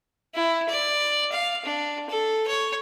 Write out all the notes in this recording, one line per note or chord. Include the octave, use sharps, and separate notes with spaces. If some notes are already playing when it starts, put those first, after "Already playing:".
E4
D5
F5
D4
A4
C#5